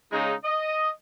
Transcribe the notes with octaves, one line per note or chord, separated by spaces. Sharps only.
C#3 G#3 D#4
D#5